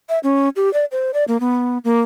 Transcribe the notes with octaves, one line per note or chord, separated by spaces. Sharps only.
E5
C#4
G4
D5
C5
D5
A#3
B3
A#3